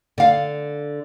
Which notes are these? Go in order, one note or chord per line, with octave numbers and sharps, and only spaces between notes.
D3 F5